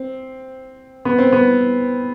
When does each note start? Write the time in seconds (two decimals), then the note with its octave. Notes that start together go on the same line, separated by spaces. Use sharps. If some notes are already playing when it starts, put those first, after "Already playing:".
Already playing: C4
1.05 B3
1.19 C4
1.32 B3